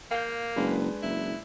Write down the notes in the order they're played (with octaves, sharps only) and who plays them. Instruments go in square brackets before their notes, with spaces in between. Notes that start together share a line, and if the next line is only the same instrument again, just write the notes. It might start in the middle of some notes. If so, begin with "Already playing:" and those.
[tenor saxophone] A#3 [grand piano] F5 G6
[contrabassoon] F#1 [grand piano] G#3 D4 B4
[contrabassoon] F#1 [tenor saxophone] E4